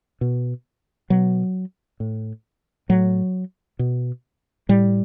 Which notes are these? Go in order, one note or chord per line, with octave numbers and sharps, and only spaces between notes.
B2
B2 F#3
A2
A2 F#3
B2
A2 G3